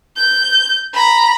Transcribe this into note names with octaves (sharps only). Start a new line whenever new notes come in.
G6
A#5 B5